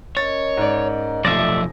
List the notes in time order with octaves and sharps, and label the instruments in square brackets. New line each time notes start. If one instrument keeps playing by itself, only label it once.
[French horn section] C#4 A#4 D#5 [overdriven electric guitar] C#5 [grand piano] A6
[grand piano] G#2 D5
[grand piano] F1 A#6 [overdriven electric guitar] B1 F3 [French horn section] A3 [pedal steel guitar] D5 E5